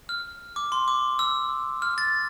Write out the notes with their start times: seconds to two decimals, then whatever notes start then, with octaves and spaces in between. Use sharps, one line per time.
0.09 F6
0.56 D6
0.72 C6
0.88 D6
1.19 E6
1.82 F6
1.98 A6